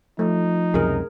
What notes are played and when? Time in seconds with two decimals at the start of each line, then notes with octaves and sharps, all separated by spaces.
0.19 F3 A3 D#4
0.74 C#2 F#2 C3 G#4 A#4